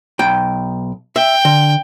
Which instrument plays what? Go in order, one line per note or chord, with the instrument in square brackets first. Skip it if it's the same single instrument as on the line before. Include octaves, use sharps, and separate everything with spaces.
[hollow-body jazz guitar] B1 G5
[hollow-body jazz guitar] E5 [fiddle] G5
[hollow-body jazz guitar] D3